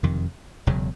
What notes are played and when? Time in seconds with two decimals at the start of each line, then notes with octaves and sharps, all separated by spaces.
0.03 F#1 F2 C3 D#3
0.67 E1 E2 C#3 F#3